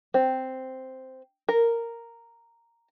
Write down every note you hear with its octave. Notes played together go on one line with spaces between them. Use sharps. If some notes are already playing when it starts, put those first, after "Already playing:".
C4
A#4